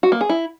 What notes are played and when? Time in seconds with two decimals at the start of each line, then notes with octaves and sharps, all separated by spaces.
0.03 F#4
0.12 A#3
0.21 G#4
0.29 E4